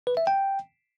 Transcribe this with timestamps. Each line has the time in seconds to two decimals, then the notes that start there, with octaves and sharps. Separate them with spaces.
0.07 B4
0.17 E5
0.27 G5